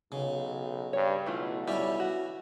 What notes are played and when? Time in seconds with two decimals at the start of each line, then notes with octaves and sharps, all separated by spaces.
0.12 B1 C#3
0.93 G2 C#5
1.26 B1 E3 A3 F4
1.68 G3 C#4 E4
2.00 F#4